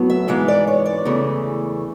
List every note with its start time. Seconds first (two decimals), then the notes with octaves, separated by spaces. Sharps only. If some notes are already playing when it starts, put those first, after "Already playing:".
Already playing: A2 F#3 B3
0.10 E5
0.28 G#2 E3 G#3 B3 F5
0.48 D5
0.67 C#5
0.86 D5
1.05 E2 C#3 E3 A3